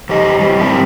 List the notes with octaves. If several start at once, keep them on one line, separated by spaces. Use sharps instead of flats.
F2 F3 G4 D#5
E3 G3
G#2 C4 A#4 E5